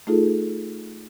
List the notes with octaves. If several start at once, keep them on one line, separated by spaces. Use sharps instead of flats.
A3 D#4 F4 G#4 A4